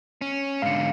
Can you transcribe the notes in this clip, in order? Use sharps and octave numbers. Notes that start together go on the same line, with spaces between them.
C#4
G#2 D3 F5 C#7